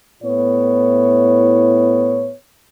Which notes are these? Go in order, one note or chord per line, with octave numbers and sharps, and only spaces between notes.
A2 B3 E4 C#5